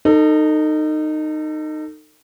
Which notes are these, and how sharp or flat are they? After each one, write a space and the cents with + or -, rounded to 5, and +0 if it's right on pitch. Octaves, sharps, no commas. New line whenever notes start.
D#4 -15 A4 +30